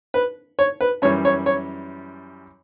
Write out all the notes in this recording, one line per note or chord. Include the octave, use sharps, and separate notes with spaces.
B4
C#5
B4
F#2 E3 G3 C#5
C#5
C#5